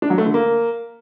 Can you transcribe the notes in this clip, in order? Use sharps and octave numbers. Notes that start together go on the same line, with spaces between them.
D4
F#3
A3
D3
A#3